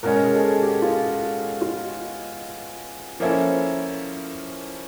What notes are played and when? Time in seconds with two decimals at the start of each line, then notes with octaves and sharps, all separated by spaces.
0.03 B2 G#3 C#4 A#4
0.23 G#4
0.35 A4
0.43 G#4
0.62 G4
0.82 F4
1.61 F4
3.20 F3 A#3 C#4 E4 A4